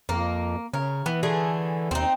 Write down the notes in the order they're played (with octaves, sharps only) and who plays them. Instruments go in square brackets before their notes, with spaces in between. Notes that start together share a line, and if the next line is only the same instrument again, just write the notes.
[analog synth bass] F2 [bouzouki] A#3
[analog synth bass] C#3 [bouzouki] A#4 C#5
[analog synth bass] E3 [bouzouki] B3
[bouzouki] D3 A3 G#4
[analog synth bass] D#2 [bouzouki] C4 D#4